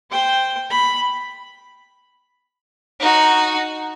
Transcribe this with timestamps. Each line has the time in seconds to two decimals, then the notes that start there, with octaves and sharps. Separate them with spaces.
0.11 C5 G5
0.70 B5
3.00 D#4 F#4